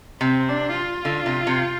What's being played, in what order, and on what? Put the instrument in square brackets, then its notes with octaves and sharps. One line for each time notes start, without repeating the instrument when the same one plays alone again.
[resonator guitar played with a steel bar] C3 [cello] C4
[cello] D4
F4
[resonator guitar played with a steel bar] D3
C3
C3